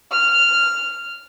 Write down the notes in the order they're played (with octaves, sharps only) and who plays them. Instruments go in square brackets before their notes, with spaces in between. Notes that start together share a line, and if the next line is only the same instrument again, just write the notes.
[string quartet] F6